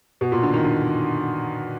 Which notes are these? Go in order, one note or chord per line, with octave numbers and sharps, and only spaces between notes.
B2
A#2
D3
D#3
D3